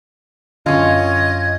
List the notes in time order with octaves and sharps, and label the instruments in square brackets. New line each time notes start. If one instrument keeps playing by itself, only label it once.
[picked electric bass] F#2 D3 [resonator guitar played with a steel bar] C#4 F4 [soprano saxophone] D#5 [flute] G#6